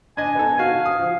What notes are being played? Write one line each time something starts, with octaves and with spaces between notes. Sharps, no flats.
D4 D#5 G#5
B3 D#4 A4
F#4 F5
D#6
F3